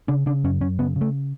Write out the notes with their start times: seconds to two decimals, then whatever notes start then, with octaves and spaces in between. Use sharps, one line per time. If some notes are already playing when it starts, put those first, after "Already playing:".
0.08 C#3 D4
0.26 C#3 D4
0.44 F#2 C#4
0.61 F#2 C#4
0.79 C#3 B3
0.96 C#3
1.01 A3